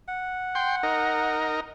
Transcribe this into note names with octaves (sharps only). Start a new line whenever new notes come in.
F#5
G5 C6
D#4 A#4